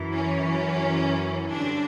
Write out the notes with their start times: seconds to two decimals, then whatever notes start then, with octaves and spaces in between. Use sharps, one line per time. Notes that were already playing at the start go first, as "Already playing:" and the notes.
Already playing: F#2 E3
0.12 C#4
1.53 G2 D3 D4